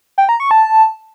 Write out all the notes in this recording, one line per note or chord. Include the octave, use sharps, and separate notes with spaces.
G5
A#5
C#6
A5